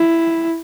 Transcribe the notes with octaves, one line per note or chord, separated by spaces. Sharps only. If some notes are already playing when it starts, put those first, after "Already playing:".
Already playing: E4